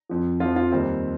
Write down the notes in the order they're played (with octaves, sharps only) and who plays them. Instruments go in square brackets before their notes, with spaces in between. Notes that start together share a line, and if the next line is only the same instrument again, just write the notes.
[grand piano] F2 F3
F2 F3 F4
F4
D#2 D#3 G3 C4